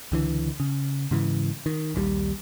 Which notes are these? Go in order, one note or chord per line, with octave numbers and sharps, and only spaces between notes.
C#2 D3 E3
C#3
G#2 C#3 E3
D#3
A#1 D#2 D#3 G3